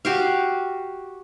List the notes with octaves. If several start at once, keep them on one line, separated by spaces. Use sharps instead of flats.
F#4 G4 F5